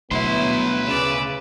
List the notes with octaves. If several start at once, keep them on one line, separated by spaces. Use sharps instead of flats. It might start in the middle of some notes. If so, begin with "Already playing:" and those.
D2 B2 F#3 B3 E4 B4 C6
C#3 D5 E6